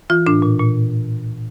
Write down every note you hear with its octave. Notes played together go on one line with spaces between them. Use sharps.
E3 F4
A2 D4
A#2
A#2